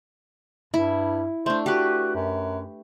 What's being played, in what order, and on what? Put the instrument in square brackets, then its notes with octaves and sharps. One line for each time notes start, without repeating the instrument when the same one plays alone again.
[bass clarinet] G2 [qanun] E4
[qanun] A3 D4 [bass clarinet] C5
[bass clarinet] F#4 [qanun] G4 B4
[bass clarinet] F#2